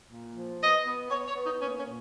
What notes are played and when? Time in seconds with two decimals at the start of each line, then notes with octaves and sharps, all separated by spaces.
0.10 A#2
0.35 F3
0.61 B3 D#5
0.86 B3
1.10 B3 C#5
1.27 C#5
1.36 B3
1.44 D#4
1.60 A#3 C#4
1.77 C#4
1.85 A#2